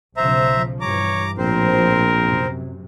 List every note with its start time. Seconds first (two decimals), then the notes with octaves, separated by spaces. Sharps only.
0.17 B1 C#3 F3 C5 E5 A#5
0.81 G2 E3 C#5 A#5 D6
1.38 A#1 A2 F3 C4 A#4 C5
2.23 F#2 C3